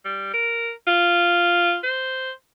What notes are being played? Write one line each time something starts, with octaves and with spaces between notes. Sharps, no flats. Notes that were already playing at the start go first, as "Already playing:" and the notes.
G3
A#4
F4
C5